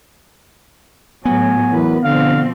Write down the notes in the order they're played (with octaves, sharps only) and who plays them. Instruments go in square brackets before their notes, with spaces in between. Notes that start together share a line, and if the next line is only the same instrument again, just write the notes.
[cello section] A2 F#3 [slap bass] B3 [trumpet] G#5
[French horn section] E3 F#3 A#4 [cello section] B4
[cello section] B2 F3 C4 [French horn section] D3 [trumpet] F5